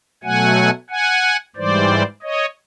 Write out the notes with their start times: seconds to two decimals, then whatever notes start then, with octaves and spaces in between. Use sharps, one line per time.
0.23 B2 F#3 A3 F#5 G#5
0.90 F#5 G#5
1.56 G#2 E3 G3 C5 D5
2.22 C#5 D#5